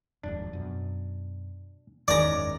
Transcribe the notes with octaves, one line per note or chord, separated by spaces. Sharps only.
D#1 F2 G#2 D4
F#2 B2
F#1 E2 G#2 D#3 G#3 C#4 D5 A#5